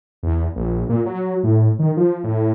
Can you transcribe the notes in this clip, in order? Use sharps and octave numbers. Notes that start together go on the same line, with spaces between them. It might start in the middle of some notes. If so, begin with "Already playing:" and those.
E2
A#1
A#2
F#3
A2
D#3
F3
A2